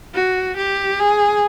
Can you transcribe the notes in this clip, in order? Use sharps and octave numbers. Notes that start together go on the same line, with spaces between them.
F#4
G4
G#4